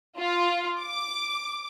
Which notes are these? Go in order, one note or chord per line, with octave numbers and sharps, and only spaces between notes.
F4
D6